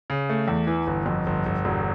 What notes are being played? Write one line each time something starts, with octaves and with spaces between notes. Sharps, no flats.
C#3
A3
E2
E3
G1
F2
G1
G1
E1